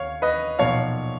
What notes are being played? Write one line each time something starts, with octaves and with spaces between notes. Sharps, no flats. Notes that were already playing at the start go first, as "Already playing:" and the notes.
Already playing: D#2 C#5 F5
B4 D#5
B1 A#2 F3 C#5 F5